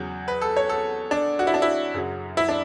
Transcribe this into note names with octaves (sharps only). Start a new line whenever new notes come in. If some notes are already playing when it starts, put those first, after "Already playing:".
Already playing: E2 C#3 F#3
B4
A4
C#5
A4
D4
F#4
E4
D4
E4
F#2 C#3 F#3
E4
D4